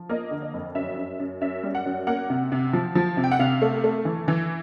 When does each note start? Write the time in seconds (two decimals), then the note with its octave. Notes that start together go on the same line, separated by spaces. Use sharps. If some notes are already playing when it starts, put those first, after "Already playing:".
Already playing: F3
0.09 A#3 D#5
0.31 D3
0.42 D#5
0.54 F2
0.75 F#2 E5
0.97 F#2
1.19 F#2
1.41 F#2 E5
1.63 G3
1.75 F#5
1.86 F#2
2.07 A#3 F#5
2.30 C3
2.52 C3
2.73 F3
2.95 F3
3.17 C3
3.24 G5
3.31 F#5
3.39 C3 F5
3.62 A3
3.84 A3
4.05 E3
4.28 E3